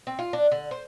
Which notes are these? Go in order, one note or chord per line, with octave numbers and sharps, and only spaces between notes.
C4
F4
D4
D3
C5